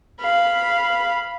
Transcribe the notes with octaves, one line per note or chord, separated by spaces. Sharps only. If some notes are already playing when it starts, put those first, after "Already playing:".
F5 B5